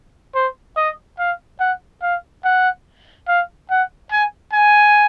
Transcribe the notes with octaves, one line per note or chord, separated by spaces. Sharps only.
C5
D#5
F5
F#5
F5
F#5
F5
F#5
G#5
G#5